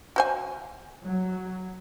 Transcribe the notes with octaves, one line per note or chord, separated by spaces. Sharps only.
F#4 C5 G#5
F#3